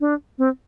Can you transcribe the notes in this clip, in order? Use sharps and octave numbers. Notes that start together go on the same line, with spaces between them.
D4
C4